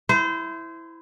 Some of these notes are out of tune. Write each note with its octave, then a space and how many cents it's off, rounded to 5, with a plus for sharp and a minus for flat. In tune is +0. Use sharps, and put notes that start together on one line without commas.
E4 +0 C5 -25